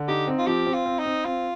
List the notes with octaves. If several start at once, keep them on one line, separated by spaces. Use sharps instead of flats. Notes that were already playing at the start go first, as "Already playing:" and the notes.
Already playing: D3
D#4 G4
C4
F4
F3 G4
C4
F4
C4
D#4
C4
C4 F4